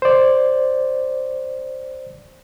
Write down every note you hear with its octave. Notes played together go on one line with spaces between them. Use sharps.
C5 D5